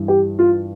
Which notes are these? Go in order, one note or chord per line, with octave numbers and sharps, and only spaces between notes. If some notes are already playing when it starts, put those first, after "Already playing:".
Already playing: G2 E3
G4
F4